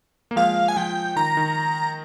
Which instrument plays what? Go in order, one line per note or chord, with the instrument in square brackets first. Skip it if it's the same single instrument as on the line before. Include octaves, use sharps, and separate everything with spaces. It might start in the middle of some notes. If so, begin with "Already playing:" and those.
[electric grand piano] A#3
[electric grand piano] F3 G#3 [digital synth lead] F5
[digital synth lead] G#5
[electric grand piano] F3 [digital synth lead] G5
[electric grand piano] D#3 [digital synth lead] A#5
[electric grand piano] D#3